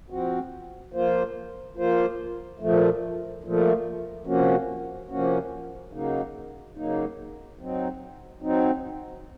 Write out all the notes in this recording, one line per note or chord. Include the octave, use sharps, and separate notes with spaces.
F3 C4 F#4
F3 A#3 F4 C5
F3 A#3 F4 C5
A#2 F3 A3
A#2 F3 A3
C3 F3 A#3 C#4 F#4
C3 F3 A#3 C#4 F#4
C#3 F#3 A#3 D#4
C#3 F#3 A#3 D#4
F#3 C4 D#4
F#3 C4 D#4